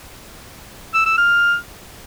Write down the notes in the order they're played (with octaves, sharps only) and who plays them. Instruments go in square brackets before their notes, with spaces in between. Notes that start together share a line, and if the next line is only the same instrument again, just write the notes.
[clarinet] E6
E6
F6